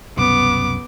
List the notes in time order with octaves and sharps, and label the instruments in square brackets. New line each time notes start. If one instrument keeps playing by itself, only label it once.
[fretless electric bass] C2 F#2 B2 [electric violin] B3 D6